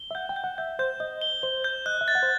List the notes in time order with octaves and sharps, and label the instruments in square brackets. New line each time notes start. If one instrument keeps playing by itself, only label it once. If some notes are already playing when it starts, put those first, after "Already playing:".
Already playing: [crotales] G7
[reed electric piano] E5
[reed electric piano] F#5 [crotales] G6
[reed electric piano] G5
[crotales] G6
[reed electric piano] F#5
[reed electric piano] E5 [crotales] G6
[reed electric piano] C5 [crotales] G6
[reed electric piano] D#5 [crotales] G6
[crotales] G7
[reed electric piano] C5 [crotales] G7
[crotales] G6
[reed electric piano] D#5 [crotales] F#6
[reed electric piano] E5
[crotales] A6
[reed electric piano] F#5
C5